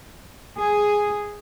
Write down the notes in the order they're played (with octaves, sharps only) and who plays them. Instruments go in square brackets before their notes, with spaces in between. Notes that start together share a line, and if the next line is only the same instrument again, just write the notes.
[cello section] G#4